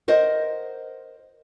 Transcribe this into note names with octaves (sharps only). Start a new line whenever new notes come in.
A#4 C5 D#5 F#5